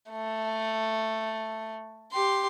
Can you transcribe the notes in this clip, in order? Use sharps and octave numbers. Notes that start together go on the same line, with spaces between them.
A3
G4 C6